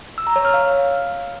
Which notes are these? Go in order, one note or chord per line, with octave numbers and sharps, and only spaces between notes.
E6
A#5
C#5
F6
F5